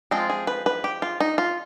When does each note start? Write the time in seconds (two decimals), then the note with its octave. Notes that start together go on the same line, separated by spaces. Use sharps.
0.11 F3 G#3 C4 F4
0.30 G#4
0.47 B4
0.66 B4
0.84 G4
1.02 F4
1.20 D#4
1.38 F4